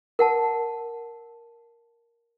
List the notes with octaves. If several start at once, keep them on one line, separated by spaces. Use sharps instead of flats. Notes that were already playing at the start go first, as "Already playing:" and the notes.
A#4 F#5 A5